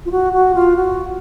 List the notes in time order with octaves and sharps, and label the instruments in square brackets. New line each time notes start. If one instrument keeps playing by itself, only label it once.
[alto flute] F4
F#4
F#4
F4
F#4